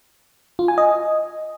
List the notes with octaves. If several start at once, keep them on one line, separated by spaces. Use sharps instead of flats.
F4
G#5
D#5